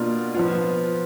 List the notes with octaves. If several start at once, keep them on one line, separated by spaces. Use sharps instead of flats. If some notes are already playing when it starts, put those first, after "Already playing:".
Already playing: B2 A#3 D4 F4
F3 B3 F4